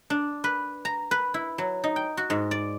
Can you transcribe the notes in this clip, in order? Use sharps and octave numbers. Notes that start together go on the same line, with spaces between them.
D4
B4
A#5
B4
E4
F#3
D#4
G5
F#4
G#2
D5